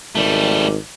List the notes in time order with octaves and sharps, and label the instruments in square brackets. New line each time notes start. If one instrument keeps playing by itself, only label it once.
[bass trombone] G#1 [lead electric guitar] G3 A3